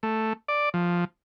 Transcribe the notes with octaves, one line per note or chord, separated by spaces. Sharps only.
A3
D5
F3